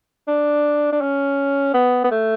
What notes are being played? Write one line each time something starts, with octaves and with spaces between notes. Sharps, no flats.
D4
D4
C#4
B3
B3
A3